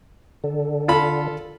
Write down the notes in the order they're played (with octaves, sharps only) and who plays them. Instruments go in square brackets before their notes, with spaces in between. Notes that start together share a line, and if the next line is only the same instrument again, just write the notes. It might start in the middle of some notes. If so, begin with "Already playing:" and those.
[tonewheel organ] D3
[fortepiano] F4 A4 B5